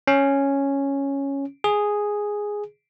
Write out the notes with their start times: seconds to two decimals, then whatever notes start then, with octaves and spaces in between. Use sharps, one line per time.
0.07 C#4
1.64 G#4